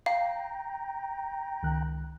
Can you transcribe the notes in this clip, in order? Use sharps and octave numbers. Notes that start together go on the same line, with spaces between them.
F5 G5 A#5
C#2 D#3 F#6